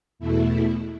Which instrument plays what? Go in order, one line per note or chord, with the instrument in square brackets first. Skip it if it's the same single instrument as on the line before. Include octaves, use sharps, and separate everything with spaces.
[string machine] E2 B2 A3 E4